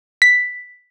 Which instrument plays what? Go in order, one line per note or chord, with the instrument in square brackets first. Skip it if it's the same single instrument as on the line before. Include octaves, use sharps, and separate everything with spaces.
[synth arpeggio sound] B6